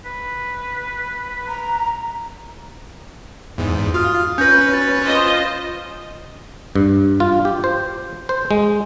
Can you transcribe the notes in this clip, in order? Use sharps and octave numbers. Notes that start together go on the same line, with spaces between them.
B4
A#5
E2 G#2
F4 F#4 D#6 F6
C#4 B4 G6 A#6
F#4 A6
F4 C5 D#5
G2
F4
G4
C5
C5
G#3